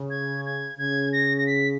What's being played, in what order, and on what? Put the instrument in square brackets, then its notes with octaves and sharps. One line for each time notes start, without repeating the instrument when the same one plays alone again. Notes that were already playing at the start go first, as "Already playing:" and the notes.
Already playing: [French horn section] C#3
[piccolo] G#6
G#6
[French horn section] C#3 [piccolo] G#6
[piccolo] A#6
A#6
B6